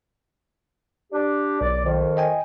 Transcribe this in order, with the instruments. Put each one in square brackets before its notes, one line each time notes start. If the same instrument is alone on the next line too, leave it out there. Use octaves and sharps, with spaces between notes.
[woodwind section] D4 G4
[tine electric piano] B1 [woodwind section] D5
[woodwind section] F2 D#3
[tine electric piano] D#5 G5 G#5